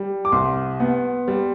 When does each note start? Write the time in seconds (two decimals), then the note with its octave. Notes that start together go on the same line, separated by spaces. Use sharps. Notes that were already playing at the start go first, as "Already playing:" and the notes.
Already playing: G3
0.25 D6
0.32 C2 C6
0.80 B3
1.28 G3